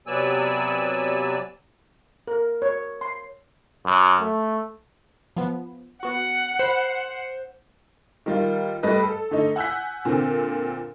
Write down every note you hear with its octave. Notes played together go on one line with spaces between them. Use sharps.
C3 F#3 B3 D5 G#5 E6
A#4
C#5
C6
F#2
A3
F3 B3
B3 F#4 F#5
C5 B5
D#3 G3 F4
G3 A3 B4 D#5
A4
D3 A3 D#4
F#5 G#5 E6 F#6 G6 B6
A#2 D3 C4